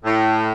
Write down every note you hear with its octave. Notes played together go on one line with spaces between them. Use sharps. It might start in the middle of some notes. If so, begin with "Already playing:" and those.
A2